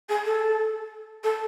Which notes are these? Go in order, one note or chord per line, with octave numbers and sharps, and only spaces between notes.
G#4
A4
A4